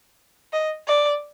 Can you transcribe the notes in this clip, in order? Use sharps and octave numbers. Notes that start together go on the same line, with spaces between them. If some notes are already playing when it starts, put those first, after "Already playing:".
D#5
D5